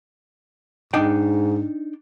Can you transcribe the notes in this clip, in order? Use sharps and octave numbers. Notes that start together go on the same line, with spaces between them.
G#2 D4 D#4 G5